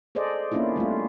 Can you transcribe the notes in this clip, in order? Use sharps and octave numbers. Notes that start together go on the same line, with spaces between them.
G#4 A4 C5 D5 D#5
A#3 B3 C#4 D4 E4 F4
G3 A3 C4 F4